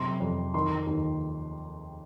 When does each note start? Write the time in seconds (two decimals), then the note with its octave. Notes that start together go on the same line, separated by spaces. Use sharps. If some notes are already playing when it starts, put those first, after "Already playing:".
Already playing: F#2 C3 C6
0.20 F2
0.54 D#3 C6
0.87 D#2